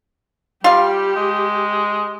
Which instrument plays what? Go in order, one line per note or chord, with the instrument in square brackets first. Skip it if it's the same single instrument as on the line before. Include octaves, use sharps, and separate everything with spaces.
[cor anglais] G3 [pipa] F4 F5 [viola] G4
[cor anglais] G#3